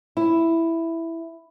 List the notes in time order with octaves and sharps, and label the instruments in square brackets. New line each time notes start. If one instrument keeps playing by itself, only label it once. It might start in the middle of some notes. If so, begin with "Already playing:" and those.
[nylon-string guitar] E4